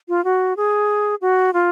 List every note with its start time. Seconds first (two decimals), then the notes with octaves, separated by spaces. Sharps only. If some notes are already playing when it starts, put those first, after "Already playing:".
0.09 F4
0.24 F#4
0.57 G#4
1.21 F#4
1.54 F4